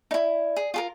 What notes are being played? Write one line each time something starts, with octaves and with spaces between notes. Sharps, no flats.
D#4 E4 D5
G#4
F4 G#4 A#4